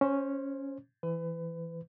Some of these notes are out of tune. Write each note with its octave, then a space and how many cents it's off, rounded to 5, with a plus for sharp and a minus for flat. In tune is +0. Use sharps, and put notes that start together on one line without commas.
C#4 +0 C5 +20
E3 +0 B4 +30